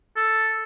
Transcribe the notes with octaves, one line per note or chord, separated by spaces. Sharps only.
A4